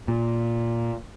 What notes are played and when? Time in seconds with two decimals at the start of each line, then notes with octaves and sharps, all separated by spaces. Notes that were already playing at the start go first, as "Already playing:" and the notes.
0.08 A#2